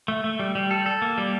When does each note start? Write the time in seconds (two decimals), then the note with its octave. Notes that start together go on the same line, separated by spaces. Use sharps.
0.08 A3
0.24 A3
0.39 G3
0.55 G3
0.71 A4
0.86 A4
1.02 A#3
1.18 G3